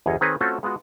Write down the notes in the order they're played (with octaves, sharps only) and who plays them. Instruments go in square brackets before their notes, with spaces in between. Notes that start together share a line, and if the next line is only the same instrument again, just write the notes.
[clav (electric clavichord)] G1 E2 G#4 C#5 D#5
D#3 C4 G#4 B4 C#5 A#5
A3 C4 C#4 F4 F#4 A4
G#3 B3 F4 F#4